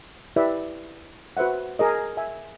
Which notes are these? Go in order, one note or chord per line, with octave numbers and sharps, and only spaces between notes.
E4 G4 B4 D5 E5
F#4 B4 C5 E5 F#5
G#4 A#4 D#5
E5 G#5